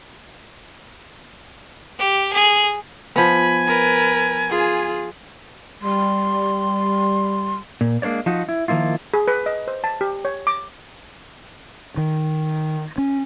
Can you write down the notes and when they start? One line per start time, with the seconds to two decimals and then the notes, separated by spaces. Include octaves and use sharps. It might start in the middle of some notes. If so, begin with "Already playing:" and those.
1.99 G4
2.33 G#4
3.16 F3 B3 G#5 B5
3.67 A#4 B4
4.49 F4 G#4
5.82 G3 C6
7.81 A#2
8.02 G#3 A#3 D4 C#5 D5
8.26 F3 D#4 F#4
8.49 E4
8.68 D#3 F3 A#3 E4 F4
9.14 G#4
9.28 B4
9.46 D#5
9.68 C5
9.84 A5
10.01 G4
10.25 C#5
10.47 D6
11.97 D#3
12.98 C#4